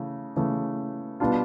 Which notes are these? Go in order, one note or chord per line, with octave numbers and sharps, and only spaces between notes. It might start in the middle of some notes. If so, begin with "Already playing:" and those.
Already playing: C#3 E3 A3
C#3 E3 A3
B2 G3 B3 D4 F4